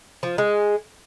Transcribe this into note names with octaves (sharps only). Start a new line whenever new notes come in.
F3
G#3